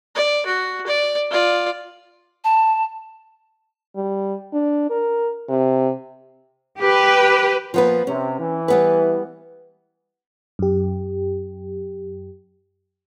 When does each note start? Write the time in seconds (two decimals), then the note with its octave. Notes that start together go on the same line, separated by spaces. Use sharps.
0.15 D5
0.46 F#4
0.87 D5
1.31 F4 D5
2.44 A5
3.96 G3
4.53 D4
4.90 A#4
5.49 C3
6.79 G4 B4
7.74 A#2 F3 B3 B4
8.07 C3 C#4
8.40 E3
8.68 G3 B3 B4
10.59 F#2 G4